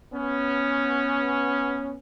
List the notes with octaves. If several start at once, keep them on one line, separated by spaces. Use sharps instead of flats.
B3 C#4